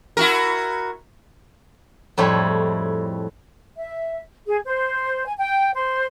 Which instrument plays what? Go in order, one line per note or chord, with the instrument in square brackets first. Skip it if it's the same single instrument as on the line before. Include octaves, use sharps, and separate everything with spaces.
[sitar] E4 F#4 A#4
[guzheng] F2 A2 G3 G#3 E4 C#5
[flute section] E5
G#4
C5
G#5
G5
C5